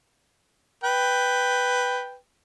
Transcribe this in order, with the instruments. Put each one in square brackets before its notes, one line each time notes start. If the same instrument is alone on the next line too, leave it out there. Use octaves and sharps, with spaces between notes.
[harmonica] B4 G5